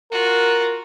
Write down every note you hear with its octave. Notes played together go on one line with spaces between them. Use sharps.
F4 F#4 A#4